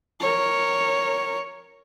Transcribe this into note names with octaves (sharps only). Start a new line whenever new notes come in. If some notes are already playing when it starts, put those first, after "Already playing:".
A#4 C#5